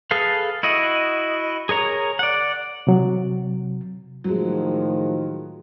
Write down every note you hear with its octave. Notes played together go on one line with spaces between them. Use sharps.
G#4 A4 B4 F5
E4 F#4 D#5
G#4 A#4 C#5 A#5
D5 F#5
C3 F#3
A2 D#3 F3 F#3 G#3